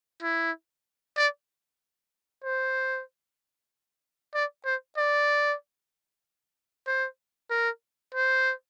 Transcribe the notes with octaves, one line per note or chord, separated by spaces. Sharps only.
E4
D5
C5
D5
C5
D5
C5
A#4
C5